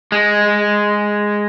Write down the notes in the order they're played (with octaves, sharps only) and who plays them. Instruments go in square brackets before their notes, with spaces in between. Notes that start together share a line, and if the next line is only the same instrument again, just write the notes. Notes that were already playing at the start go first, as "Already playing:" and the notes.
[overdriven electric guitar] G#3